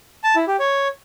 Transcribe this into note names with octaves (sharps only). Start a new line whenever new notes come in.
A5
E4
G4
C#5